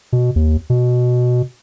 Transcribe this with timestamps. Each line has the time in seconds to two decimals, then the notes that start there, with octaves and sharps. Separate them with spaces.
0.13 B2
0.36 D#2
0.70 B2